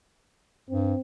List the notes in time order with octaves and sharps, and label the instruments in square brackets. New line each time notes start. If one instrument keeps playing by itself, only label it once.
[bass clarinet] G2 [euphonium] C4